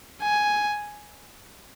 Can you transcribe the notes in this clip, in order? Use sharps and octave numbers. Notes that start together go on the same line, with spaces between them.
G#5